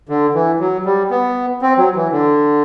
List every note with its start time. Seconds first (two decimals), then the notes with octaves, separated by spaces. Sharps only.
0.09 D3
0.34 E3
0.60 F#3
0.85 G3
1.10 B3
1.62 C4
1.77 F#3
1.96 E3
2.12 D3